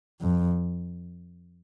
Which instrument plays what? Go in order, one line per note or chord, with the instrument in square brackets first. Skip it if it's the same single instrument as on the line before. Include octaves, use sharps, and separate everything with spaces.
[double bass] F2